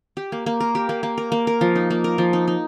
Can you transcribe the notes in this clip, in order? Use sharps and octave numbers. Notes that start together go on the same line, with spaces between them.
G4
A#3
A#3
A#4
G4
A#3
A#3
A#4
A#3
A#4
F3
D#4
A#3
A#4
F3
D#4
D#4